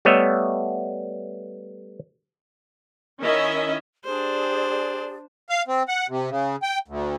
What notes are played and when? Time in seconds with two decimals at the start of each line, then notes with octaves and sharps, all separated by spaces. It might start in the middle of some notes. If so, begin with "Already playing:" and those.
0.05 G3 A3 B3 C#5 D#5 E5
3.20 D#3 C#4 E4 D#5 E5
4.04 D4 G4 G#4 C5 D5
5.49 F5
5.68 C4
5.88 F#5
6.09 C3
6.30 C#3
6.62 G5
6.88 D2